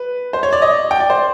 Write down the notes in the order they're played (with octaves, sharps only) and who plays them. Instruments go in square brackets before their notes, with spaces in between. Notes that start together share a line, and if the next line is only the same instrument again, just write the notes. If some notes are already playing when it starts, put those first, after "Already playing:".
Already playing: [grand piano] B4
C5
C#5
D5
D#5
G5
D5
C5